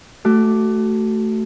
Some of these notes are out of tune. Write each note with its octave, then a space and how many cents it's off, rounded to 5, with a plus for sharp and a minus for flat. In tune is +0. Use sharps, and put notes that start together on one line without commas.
A3 +0 F#4 +20 D6 +0